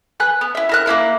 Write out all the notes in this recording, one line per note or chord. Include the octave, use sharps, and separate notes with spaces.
B4 G#5 F#6
B3
E4 E5
E4 A#4 F#6
A#3 D4 E4 A#4